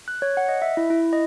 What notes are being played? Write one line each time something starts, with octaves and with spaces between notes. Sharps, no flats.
F#6
C#5
F#5
D#5
E5
E4
E4
D#5